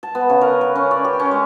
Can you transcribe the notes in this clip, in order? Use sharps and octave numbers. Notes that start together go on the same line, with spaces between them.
A5
B3
C#3
A#4
B4
C#4
D5
G4
C#4
G#3